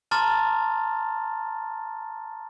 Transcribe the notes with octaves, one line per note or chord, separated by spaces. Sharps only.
A5 A#5 C6 D6 F6 A6